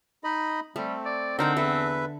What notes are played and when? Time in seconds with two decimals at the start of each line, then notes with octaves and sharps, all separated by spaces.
0.24 D#4 D#5 B5
0.76 G3 A3 C4
1.06 D5
1.39 D3 C4 D#4 A#4 C5 F#5 A#5
1.57 E2 A4 B4 E5